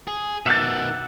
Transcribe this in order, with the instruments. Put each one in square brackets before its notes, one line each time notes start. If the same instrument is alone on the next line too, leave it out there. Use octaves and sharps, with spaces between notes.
[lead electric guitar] G#4
[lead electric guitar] B2 D#3 [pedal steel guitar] E5 F#5 D6 [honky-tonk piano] E6 A6